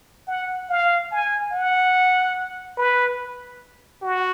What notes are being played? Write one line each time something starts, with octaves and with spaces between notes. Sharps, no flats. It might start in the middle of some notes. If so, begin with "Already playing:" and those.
F#5
F5
G#5
F#5
B4
F#4